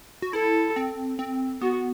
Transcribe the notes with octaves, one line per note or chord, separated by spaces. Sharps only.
F#4
E4 A4
C4
C4
B3 F#4